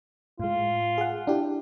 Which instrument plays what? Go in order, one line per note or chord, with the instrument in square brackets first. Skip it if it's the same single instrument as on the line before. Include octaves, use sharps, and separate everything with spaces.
[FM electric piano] A2 G#3 [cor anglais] F4
[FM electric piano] G#4 F#5
D4 E4 G4